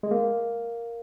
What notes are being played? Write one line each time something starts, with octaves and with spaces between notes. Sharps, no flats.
G#3
A#3